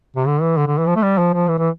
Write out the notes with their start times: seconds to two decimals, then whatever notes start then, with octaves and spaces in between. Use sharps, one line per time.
0.16 C3
0.27 D3
0.41 E3
0.57 D3
0.67 D3
0.78 E3
0.87 F3
0.96 A3
1.03 G3
1.18 F3
1.33 F3
1.48 E3
1.58 E3